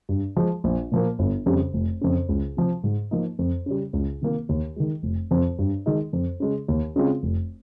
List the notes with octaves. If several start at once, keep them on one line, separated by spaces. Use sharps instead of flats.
G2
F3 G#3
A#1
A#2 F3 A#3
G1
F2 C#3 G3
F1
F2 C#3
C#2
C3 F3
G#2
F3 A#3 D#4
F2
C#3 G3
C#2
C3 D#3 A#3
D#2
D#3 G#3
F1
F2 C3 F3 C4
G2
D#3 G#3 D#4
F2
C#3 G#3
D#2
C#3 G#3 C4 F4
F1